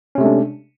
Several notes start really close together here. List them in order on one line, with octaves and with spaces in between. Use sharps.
C#4 C3 A3 G#3 D4